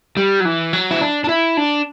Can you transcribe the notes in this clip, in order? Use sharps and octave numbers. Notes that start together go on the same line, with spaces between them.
G3
F#3
E3
F#3
E4
D4
D4
E4
D4